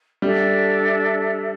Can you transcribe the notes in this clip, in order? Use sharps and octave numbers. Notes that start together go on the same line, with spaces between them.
G3 D4 A4 E5